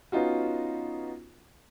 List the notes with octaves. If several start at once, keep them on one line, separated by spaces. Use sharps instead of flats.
B3 C#4 D#4 F4 F#4